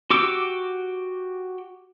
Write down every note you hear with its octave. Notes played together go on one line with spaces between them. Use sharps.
F#4 G4 D6 E6